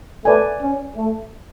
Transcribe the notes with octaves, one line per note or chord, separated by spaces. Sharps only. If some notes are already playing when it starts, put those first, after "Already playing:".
A3 B4 D5 G#5
C#4
A3